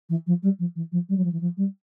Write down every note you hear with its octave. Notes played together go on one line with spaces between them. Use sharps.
E3
F3
G3
F3
E3
F3
G3
F#3
F3
E3
F3
G3